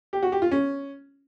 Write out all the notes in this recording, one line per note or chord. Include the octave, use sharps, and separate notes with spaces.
G4
F#4
G4
F4
C#4